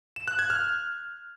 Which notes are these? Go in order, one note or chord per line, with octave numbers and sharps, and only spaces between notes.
E7
F#6
G#6
F6